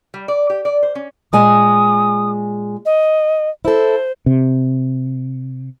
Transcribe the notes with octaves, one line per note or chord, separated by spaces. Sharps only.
G3
D5
G4
D5
C5
C#4
A#2 G#3 G#5 D#6
D#5
E4 A4 C5
C3